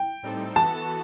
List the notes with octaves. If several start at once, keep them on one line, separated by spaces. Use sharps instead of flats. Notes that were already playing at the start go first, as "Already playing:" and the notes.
Already playing: G5
A2 G3 C4 D#4 A4
E3 B3 F#4 A4 A5